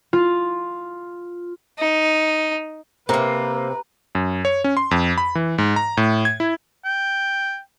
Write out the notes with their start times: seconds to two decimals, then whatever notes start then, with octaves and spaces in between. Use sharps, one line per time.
0.13 F4
1.79 D#4
3.09 C3 A#3 C4 A#4 B4
4.15 F#2
4.45 C#5
4.64 C#4
4.77 C6
4.91 F2
5.18 B5
5.35 E3
5.58 G#2
5.76 A#5
5.97 A2
6.25 G#6
6.40 E4
6.85 G5